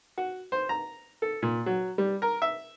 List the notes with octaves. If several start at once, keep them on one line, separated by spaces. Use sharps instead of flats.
F#4
C5
A#5
A4
A#2
F#3
G3
A#4
E5